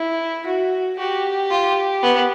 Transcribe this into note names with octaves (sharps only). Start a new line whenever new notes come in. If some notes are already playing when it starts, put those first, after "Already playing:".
Already playing: E4
F#4
F#4 G4
F4
B3